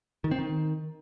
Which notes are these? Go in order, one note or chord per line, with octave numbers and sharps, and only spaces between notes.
D#3
C4
D#3